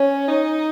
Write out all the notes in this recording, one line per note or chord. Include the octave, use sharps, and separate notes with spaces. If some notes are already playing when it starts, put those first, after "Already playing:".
Already playing: C#4
D#4